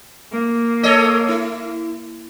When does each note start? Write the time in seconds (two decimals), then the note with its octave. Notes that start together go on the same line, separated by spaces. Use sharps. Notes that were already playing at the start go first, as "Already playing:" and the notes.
0.32 A#3
0.83 A4 C#5 D#5
1.28 E4